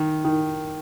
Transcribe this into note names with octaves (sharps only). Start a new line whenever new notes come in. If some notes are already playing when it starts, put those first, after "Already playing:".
Already playing: D#3
D#3